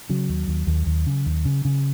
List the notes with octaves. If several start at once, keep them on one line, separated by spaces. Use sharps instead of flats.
C#3 F#3
D#2
D#2
D#2
D#2
C#3
D#2
C#3
C#3